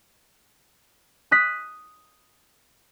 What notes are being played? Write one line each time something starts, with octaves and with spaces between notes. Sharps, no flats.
D#6 F#6 B6